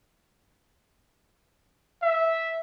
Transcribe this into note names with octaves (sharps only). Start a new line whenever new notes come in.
E5